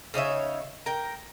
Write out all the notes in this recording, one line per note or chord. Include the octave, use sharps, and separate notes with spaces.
C#3 D#4 C#5 E5
A#4 G5